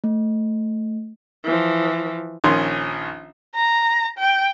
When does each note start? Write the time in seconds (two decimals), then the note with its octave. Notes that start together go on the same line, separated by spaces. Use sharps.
0.04 A3
1.44 E3 F3
2.44 A#1 D#3 C#4 C6
3.55 A#5
4.18 G5